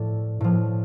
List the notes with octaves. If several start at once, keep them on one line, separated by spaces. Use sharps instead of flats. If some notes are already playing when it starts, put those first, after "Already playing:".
Already playing: A2 F3 A4 D5
A2 F3